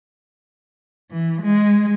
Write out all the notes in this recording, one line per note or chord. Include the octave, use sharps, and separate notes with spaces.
E3
G#3